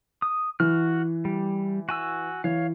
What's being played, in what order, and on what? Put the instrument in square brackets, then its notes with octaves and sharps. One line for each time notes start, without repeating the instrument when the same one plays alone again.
[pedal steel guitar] D#6
[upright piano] E3 [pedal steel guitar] F#4 F6
[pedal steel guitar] G3
F#4 G#5 E6
[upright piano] E3 [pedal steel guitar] C#5 F5